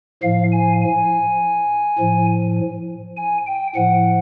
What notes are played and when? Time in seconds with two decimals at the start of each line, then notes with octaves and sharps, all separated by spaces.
0.23 A2 F3 F5
0.52 G#5
0.82 G#5
1.99 A2 F3
3.17 G#5
3.46 G5
3.75 A2 F3 F#5